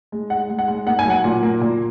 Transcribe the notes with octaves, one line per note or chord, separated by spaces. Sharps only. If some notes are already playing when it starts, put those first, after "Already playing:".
G#3
G#3 F#5
G#3
F#5
G#3
A#3 F#5
G#5
F#3 F#5
A#2
A#3
A#2